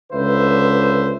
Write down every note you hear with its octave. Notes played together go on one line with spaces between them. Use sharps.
C#2 D3 B4 C5 E5